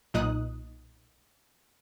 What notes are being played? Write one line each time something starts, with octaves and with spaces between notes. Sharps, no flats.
B1 A#2 D#4 D#6 F#6